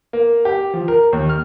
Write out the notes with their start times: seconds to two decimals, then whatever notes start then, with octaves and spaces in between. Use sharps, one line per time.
0.13 A#3
0.45 G4
0.74 F3
0.88 A#4
1.13 D#2
1.29 F6